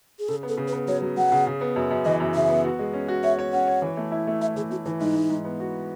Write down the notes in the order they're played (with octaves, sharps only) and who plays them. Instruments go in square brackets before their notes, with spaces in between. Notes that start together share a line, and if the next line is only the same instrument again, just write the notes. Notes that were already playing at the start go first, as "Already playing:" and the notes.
[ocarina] G#4
[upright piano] C#3 [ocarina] A4
[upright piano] B3
[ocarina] A4
[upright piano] C#3
[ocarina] B4
[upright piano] B3
[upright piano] F#3 [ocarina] C#5
[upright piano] F#3
[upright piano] F#3 [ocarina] F#5
[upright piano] C#3
C#3
B3
F#2
F#2
[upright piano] E3 [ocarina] D#5
[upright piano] F#2
[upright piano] C#3 [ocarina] E5
[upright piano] B3
F#4
G#3
C#4
F#4
[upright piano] C#5 [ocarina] E5
[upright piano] C#5
[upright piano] C#4 [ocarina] F#5
[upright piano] C#5
E3
A3
E4
A3
[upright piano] E4 [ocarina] E5
[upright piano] E3 [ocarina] G#4
[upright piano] A3 [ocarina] F#4
[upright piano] E3 [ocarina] E4
[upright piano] G#2 [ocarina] D#4
[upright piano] G#2
G#2
B3
F#4